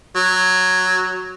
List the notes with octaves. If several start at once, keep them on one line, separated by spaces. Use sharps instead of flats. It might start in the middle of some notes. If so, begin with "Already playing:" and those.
F#3